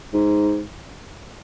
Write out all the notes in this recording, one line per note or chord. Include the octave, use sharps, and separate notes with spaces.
G#2